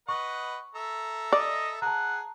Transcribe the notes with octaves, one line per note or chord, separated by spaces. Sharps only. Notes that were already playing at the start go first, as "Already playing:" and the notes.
B4 D#5 F#5 C#6
A4 E5 A#5
D5 D#5
G#4 F#5 A5 A#5